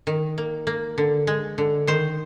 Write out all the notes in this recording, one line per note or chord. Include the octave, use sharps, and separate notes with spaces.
D#3
A#3
A#3
D3
G#3
D3
D#3 C5